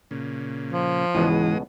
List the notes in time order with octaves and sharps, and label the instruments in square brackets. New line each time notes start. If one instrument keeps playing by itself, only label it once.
[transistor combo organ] A#2 C#3
[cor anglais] F3
[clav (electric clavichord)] C#2 B2 B3 [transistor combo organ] G#2 G#3 D#6 [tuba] E3